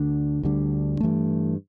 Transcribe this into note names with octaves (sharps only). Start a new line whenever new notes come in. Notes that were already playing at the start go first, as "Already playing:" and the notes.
Already playing: D2 D3 D4
D2 D3 G3 D4
G2 E3 A3